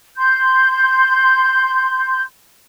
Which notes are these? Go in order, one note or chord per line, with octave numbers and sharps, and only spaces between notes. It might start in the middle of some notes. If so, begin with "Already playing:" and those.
C6 G6